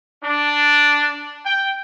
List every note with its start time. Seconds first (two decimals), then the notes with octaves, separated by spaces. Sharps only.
0.23 D4
1.45 G5